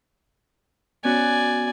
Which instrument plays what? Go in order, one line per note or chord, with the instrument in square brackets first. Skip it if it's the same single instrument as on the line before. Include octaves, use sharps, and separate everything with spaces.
[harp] B3 C#4 F#4 [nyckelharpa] D5 G#5